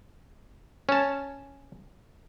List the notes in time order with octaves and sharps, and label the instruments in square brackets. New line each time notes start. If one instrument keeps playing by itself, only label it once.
[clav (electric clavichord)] C#4 A5